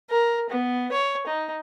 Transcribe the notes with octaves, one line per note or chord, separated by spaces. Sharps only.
A#4
B3
C#5
D#4